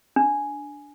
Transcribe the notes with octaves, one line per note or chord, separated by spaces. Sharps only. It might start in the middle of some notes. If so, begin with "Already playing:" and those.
D4